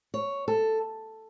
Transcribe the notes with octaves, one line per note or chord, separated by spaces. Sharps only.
C#5
A4